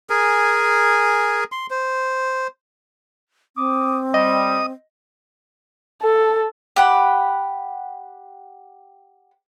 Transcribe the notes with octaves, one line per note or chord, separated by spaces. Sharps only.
G#4 A#4 G#5
C6
C5
C4 D6 D#6
G3 D#5 D#6
A4
G4 F#5 B5